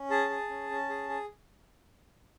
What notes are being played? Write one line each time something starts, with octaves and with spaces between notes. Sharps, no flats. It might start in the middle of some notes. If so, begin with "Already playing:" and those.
Already playing: C#4
G#4 A5
G#4
C#4
C#4
G#4
G#4